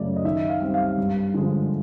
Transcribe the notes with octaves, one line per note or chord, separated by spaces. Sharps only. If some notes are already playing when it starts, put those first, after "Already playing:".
Already playing: F#2 C#3 F#3 A3 C#4 D5
D#5
D#3 E5
F5
G3 C4
F5
G2
D3 F3 G#3